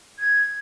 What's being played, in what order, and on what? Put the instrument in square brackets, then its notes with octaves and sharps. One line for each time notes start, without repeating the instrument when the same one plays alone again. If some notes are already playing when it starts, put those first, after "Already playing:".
[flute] G#6